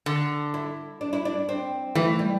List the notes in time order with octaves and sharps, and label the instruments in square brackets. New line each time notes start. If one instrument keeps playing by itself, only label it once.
[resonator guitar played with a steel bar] D3
[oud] E4
D4
E4
D4
C4
[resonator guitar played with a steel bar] E3 [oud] A3
[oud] G3